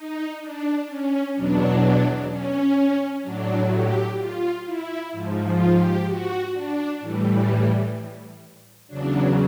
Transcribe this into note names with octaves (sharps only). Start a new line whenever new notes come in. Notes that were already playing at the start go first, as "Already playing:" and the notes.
Already playing: D#4
D4
C#4
E2 B2 F#3 D4
C#4
A2 F#3 D4
G4
F4
E4
G#2 F3
F4
G4
F#4
D4
A2 E3 G3
E2 C#3 F#3 D4